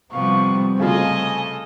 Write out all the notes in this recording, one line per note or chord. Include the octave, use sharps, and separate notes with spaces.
C3 F3 G3 B3 C4 F5 C#6
C#3 A3 F4 A4 D#5 G#5